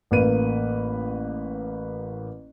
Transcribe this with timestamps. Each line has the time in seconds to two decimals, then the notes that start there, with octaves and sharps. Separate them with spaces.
0.11 A1 A#3 B4 D#7